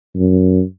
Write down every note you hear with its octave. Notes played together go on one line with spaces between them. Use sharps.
F#2